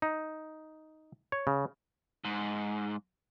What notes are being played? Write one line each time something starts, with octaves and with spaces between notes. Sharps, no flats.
D#4
C#5
C#3
G#2